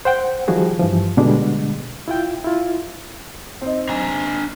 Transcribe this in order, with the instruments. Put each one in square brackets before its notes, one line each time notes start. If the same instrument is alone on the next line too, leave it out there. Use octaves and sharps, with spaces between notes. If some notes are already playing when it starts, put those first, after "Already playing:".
[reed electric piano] C5 F#5 G5
D#3 F3 G3 F#4 G#4
G2 E3 F3
B2 D3 G3 G#3 D4
E4 F4 G5
E4 F4
[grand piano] C4 D#4
[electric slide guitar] D4 G#5 A#5